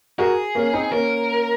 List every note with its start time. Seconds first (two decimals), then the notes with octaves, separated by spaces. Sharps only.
0.19 F#4 G#4 A#4
0.55 A#3 C#4
0.73 C4 D#4
0.91 A#3 C#4 A#4